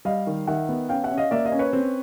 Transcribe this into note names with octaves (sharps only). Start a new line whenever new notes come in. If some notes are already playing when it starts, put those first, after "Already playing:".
G3 D#5 F5
D#3
D#3 E5 F#5
B3
C#4 F5 G5
E5 F#5
C#4
D#5 F5
A#3 D5 E5
D#5 F5
C#4
B4 C#5
C4